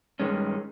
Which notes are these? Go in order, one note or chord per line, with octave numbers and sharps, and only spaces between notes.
G2 D#3 G#3 C#4